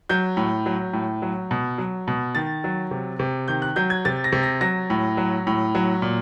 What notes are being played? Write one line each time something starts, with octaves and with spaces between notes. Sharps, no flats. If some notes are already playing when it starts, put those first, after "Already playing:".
F#3 G6
A2
F#3
A2
F#3
B2
F#3
B2
D#3 A6
F#3
C3
C3
D#3 G6
F#6
F#3 G6
G#6
C3 A6
A#6
C3
A#6
F#3 A#6
A2
F#3
A2
F#3
A#2